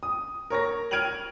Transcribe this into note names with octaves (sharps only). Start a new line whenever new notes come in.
D#6
A#4 C#5 C#6 A#6
F6 G#6 D7 D#7 F7 F#7